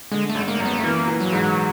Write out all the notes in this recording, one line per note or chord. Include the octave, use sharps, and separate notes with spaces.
D3 G#3
A3
G#1
A#3
F#2
B3
A3
E3 A#3
E3
F#3
G#2